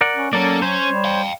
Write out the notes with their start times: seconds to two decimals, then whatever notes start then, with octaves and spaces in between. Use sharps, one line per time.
0.01 A#4 D5 F#5
0.16 C#4
0.33 F#3 A#3 C#4 A4 D5
0.62 C#4 C5 C#5
0.89 G3
1.04 F5 G5